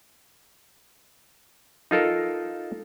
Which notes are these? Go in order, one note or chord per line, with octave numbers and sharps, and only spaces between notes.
D#4 F4 A4 A#4